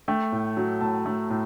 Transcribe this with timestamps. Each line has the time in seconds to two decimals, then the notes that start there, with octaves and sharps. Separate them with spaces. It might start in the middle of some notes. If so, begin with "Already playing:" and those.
0.08 A3 G5
0.32 A2
0.57 F#3
0.81 A2 A5
1.06 A3
1.30 A2